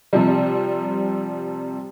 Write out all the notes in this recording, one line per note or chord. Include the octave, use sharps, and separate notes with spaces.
C3 F3 G3